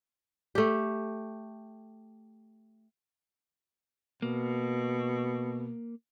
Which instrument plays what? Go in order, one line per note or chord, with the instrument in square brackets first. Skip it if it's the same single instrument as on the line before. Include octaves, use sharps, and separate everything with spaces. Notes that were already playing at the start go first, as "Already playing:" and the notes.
[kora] A3 G4
[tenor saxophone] B2 [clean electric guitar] A#3